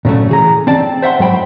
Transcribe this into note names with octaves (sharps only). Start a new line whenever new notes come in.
A#2 C#3 F#3 A3
E3 G#4 A#5
C4 D5 A5
C5 E5 F#5 B5 C6
G#2 F#3 C5 G5 B5